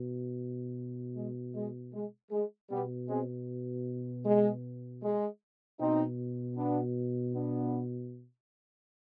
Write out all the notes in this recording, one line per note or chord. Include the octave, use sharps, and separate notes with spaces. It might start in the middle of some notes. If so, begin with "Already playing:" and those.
Already playing: B2
G#3
G#3
G#3
G#3
B2 G3 B3
G#3 C4
G#3
G#3
B2 C4 D#4
B3 D4
B3 D4